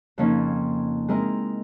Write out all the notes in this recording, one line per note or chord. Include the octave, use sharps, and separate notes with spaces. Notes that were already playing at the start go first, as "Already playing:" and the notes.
F2 C#3 F3 A#3 C#4 D#4
G#3 C4 E4 A#4 D#5